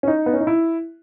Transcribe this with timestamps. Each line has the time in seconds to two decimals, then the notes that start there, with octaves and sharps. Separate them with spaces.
0.03 C#4
0.08 D#4
0.26 B3
0.34 C#4
0.41 D#4
0.47 E4